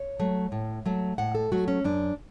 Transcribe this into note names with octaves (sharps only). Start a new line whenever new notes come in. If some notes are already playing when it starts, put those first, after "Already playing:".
Already playing: C#5
F#3 A3
A2
F#3 A3
A2 F#5
A4
F#3 A3 F#4
C#4
F#2 D4